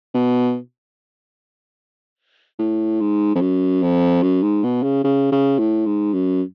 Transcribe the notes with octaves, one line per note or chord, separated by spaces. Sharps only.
B2
A2
G#2
F2
F#2
F2
F#2
G#2
B2
C#3
C#3
C#3
A2
G#2
F#2